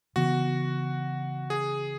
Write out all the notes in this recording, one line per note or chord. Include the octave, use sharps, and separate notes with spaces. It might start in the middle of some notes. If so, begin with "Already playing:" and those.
C#3 E3 B3 F#4
G#4